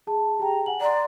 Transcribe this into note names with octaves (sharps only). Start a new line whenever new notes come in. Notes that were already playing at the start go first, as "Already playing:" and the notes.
G#4 A5
G4 G#4 G5 A#5
F#5 G#5 F#7
D5 A#5 C6